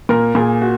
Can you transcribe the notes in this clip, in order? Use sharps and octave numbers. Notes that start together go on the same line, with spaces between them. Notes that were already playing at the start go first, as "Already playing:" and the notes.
A#2 A#4
A#2 G#4
F#4